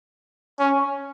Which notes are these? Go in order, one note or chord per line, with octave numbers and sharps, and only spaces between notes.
C#4